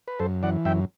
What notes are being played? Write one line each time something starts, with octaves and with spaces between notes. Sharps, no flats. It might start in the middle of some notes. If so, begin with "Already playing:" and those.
B4
F#2 A4 C5
E3 D5 F#5
F#2 E5 G5